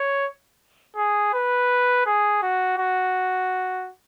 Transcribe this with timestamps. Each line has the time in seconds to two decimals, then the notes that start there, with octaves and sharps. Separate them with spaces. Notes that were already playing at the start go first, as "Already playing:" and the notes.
Already playing: C#5
0.97 G#4
1.34 B4
2.06 G#4
2.43 F#4
2.78 F#4